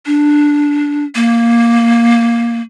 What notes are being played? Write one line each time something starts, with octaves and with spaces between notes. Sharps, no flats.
D4
A#3